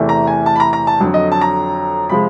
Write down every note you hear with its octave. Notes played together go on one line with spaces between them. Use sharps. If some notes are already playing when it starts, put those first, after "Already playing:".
Already playing: E2 C3 E3 A3
A#5
G#5
A5
B5
A#5
A#5
A5
F2 D3 F#3
D#5
A5
A#5
C3 F3 G#3 B5